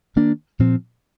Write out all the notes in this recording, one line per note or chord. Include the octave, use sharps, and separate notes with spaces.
D#3 A#3 D4
A#2 F3 C4